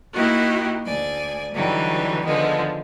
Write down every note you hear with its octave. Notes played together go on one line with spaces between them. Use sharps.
A#3 D#4 E4 F#4 G4 A#4
D2 D5 G#5
D3 E3 F#3 G3 D#4
D3 D#3 F3 G#3 B3